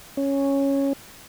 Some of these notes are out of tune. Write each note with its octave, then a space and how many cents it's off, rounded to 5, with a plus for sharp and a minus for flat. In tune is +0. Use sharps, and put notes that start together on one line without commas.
C#4 -5